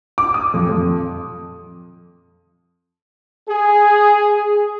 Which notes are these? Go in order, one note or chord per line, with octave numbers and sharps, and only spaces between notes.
D6
D#6
F2
F2
G#4